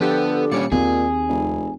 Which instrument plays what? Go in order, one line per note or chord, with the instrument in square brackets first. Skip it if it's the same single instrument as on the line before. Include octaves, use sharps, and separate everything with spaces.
[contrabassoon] D3 [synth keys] F3 G4 A4 [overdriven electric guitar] B3
[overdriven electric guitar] A#2 C#4 [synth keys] G3 D5 C#7
[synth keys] D#2 [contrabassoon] A#2 [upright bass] C4 [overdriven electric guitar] G#4
[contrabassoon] F1